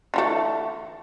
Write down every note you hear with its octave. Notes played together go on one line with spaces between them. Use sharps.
D3 E3 A3